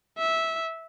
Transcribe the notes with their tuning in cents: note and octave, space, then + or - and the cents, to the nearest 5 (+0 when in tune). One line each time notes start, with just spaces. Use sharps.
E5 -15